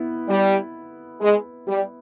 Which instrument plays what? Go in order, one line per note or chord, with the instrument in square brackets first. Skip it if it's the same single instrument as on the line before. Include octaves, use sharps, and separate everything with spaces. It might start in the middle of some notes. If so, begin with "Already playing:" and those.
Already playing: [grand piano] B3 E4
[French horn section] G3
G#3
G3